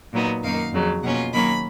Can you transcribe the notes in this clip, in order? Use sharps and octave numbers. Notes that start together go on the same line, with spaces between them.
A#2 F#3 B3 D#4
F#2 D#3 A#3 D#4 F5
F2 C#3 F#3
B2 A#3 C#4 F4 F#5
D#3 F#3 A#3 C#4 B5